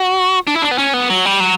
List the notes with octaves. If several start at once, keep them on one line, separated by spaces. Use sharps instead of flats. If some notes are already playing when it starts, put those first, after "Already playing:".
Already playing: F#4
D4
E4
D4
B3
C#4
B3
F#3
G3
F#3